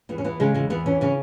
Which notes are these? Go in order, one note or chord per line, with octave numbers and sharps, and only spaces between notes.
E2 B3
C#4
E3 B3
C#3 G#3
E2 G#3
E2 B3
E3 C#4
C#3 C#4